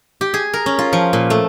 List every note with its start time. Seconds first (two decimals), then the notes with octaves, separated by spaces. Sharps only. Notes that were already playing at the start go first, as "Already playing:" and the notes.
0.21 G4
0.34 G#4
0.53 A#4
0.66 C#4
0.79 F4
0.93 F3
1.13 A#2
1.30 A3